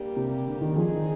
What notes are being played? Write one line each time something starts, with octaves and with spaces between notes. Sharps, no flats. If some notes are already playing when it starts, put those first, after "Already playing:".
Already playing: G3 A#3 D4 G4
C3
D3
D#3
F3 C4 D#4 G#4
D#3